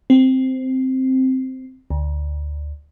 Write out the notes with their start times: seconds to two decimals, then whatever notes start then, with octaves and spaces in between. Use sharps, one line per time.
0.10 C4
1.90 D2